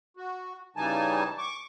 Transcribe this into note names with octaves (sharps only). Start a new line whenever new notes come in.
F#4
C#3 E3 G3 D#4 G#5 A5
C#6 D6